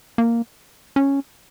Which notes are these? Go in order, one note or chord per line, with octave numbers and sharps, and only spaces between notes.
A#3
C#4